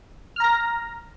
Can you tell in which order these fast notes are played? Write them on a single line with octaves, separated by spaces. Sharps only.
F6 A#5 A#6